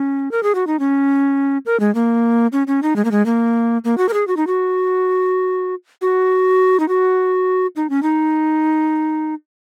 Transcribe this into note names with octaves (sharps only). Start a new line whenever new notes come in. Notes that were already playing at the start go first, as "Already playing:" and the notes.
Already playing: C#4
A#4
G#4
F#4
D#4
C#4
A#4
G#3
A#3
C#4
C#4
D#4
G#3
A#3
G#3
A#3
A#3
F#4
A#4
G#4
F#4
D#4
F#4
F#4
D#4
F#4
D#4
C#4
D#4